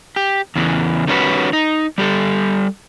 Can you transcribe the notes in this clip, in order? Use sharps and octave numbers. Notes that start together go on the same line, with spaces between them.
G4
E2 C#3 E3
D#3 G3 C#4 E4 F#4 B4
D#4
G3 G4 A4